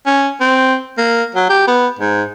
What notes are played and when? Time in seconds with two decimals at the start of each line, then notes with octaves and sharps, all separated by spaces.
0.07 C#4
0.41 C4
0.98 A#3
1.35 F#3
1.50 G4
1.68 B3
1.99 G#2